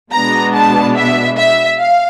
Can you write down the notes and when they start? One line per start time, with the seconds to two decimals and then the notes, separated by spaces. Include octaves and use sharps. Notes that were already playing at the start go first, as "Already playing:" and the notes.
0.12 B2 G#3 B3 D4 A#5
0.54 A5
0.96 E5
1.38 E5
1.80 F5